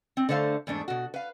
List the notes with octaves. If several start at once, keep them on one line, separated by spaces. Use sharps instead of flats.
C4
D3 A3 C5 D5 F5
E2 G#2 A3 D4
B2 F#4
B4 F5